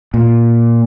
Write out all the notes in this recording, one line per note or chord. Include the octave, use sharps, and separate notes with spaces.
A#2